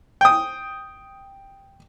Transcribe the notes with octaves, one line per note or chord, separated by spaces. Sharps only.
G5 D#6